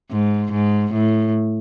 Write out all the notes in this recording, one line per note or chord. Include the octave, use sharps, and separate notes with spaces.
G#2
G#2
A2